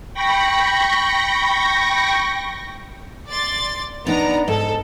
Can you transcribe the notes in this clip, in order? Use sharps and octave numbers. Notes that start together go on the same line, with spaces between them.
G5 B5 C#6 A#6
D5 C6 A6
B3 D4 D#4 D5 A#5
G#2 A4